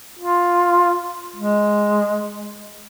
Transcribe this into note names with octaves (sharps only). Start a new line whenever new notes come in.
F4
G#3